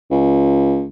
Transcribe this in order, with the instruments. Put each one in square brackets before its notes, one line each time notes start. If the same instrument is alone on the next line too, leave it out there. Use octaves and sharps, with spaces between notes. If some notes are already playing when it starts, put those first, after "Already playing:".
[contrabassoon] C#2